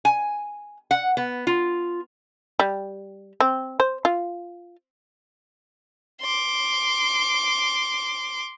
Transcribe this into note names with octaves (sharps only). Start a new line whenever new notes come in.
G#5
F#5
B3
F4
G3
C4
C5
F4
C6 D6